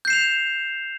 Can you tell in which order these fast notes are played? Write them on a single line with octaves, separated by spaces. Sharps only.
G6 C7 E7 F7